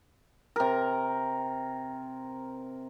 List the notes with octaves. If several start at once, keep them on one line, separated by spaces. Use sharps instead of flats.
C3 A#4